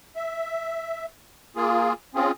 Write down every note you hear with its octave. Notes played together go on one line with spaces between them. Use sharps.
E5
A#3 F4 G#4
C4 C#4 F4 G#4